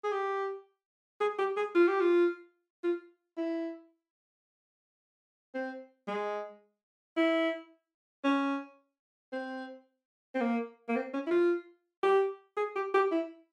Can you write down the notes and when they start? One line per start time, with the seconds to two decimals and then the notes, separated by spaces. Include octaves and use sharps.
0.04 G#4
0.12 G4
1.21 G#4
1.39 G4
1.57 G#4
1.75 F4
1.88 G4
2.00 F4
2.83 F4
3.37 E4
5.54 C4
6.08 G#3
7.17 E4
8.24 C#4
9.32 C4
10.35 C4
10.40 A#3
10.89 A#3
10.96 C4
11.13 C#4
11.27 E4
11.31 F4
12.03 G4
12.57 G#4
12.76 G4
12.94 G4
13.12 E4